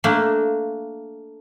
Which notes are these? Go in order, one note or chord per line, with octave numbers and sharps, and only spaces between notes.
A3 A#3 D4